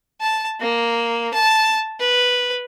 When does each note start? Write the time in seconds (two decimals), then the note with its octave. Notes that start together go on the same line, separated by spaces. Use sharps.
0.21 A5
0.60 A#3
1.34 A5
2.00 B4